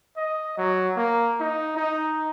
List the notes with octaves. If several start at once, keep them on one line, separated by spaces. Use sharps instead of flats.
D#5
F#3
A#3
D#4
D#4